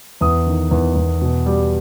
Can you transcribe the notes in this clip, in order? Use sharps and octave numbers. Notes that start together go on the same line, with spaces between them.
E2 D#6
D#3
E2
E2
B2
G3